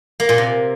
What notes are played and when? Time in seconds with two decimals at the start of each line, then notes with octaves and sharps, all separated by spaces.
0.20 A#3
0.29 A#2
0.38 C3